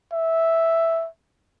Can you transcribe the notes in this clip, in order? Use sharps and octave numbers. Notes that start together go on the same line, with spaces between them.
E5